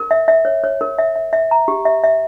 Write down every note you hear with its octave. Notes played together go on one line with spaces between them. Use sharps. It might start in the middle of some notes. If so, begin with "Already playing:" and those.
Already playing: A#4
E5
E5
C#5
C#5
A#4
E5
E5
E5
A#5
G4
E5
E5